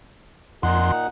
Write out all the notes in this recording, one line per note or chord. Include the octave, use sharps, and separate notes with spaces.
F2 A#2 D#4 F#5 C6